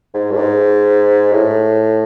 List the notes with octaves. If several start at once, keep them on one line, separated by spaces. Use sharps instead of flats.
G#2
G2
G#2
A2